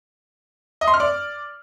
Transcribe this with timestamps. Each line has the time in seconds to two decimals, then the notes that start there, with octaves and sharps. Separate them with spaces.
0.81 D#5
0.88 C6
0.94 F6
1.00 D5